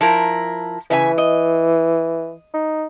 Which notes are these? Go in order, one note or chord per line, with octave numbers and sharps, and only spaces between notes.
F3 E4 A#4
C#3 E3 E5 G#5
D#5
D#4